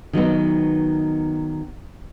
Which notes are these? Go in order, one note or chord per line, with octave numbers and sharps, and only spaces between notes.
D#3 F#3 B3 D#4